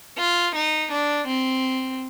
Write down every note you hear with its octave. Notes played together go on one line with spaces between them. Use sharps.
F4
D#4
D4
C4